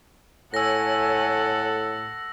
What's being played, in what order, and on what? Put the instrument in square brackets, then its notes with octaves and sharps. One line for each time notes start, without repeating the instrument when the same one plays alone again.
[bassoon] A2 [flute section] E4 C#5 G#5 [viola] A4 F#5 [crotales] E6 A#6